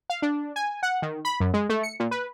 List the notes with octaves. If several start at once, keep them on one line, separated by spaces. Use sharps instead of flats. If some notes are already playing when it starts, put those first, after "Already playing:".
F5
D4
G#5
F#5
D#3
B5
F#2
G#3
A3
C#7
A#2
B4